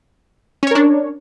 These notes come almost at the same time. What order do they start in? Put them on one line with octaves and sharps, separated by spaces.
C#4 C#5 A#4 D4